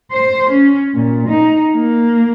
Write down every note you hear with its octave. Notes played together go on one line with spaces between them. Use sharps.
C5
C#4
A#2
D#4
A#3